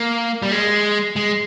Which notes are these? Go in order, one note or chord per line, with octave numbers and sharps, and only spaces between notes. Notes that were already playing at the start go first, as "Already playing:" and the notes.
Already playing: A#3
G3
G#3
G#3